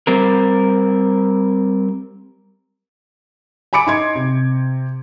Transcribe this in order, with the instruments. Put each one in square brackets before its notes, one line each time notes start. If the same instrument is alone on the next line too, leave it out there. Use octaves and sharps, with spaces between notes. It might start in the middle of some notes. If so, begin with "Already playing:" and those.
[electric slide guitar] G3 C4 A#4
[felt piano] G#5 B5 D6 C#7 D7
D#4 C6 G#6
C3